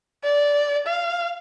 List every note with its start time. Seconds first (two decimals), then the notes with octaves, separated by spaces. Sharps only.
0.24 D5
0.87 F5